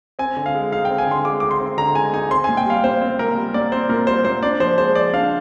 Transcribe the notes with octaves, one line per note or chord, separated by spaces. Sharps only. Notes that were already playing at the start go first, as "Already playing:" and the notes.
C4 G#5
D3
F5
G#3
D#4 F5
G5
C4
G#5
D3 C6
G#3 D6
D#4 D6
C6
C4
D3 A#5
G#3 G#5
D#4 G#5
C4 C6
A#2 G#5
G5
G3 F5
A#2 C5
C4 C5
A#2 A#4
G3
A#2 D5
C4 C5
A#2 A#4
G3 C5
A#2 C5
D4 D5
F3 C5
G#3 C5
F3 D5
D4 F5